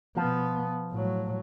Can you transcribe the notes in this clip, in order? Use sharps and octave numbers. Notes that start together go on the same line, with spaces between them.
B2 F3 B3
A2 F#3